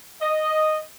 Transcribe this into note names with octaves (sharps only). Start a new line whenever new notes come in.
D#5